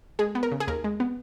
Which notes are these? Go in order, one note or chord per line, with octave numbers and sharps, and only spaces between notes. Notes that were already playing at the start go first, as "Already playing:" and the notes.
G#3 G#4
B3
A#4
C#3
G#4
D#2 A#4
G#3
B3